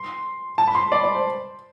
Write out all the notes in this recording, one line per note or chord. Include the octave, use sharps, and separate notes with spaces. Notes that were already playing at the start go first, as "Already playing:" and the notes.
Already playing: C6
A5
B5
C6
D5
D5
C5